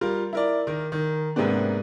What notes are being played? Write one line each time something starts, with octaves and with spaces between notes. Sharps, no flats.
G3 F4 A#4
E4 A#4 D5
D#3 A#4
D#3
G#2 C3 A#3 B3 D4